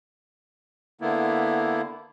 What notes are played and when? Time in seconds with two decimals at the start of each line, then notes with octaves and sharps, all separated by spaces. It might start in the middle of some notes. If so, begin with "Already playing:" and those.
1.01 D3 A#3 B3 E4